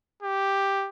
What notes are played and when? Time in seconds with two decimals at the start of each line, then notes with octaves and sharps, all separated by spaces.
0.23 G4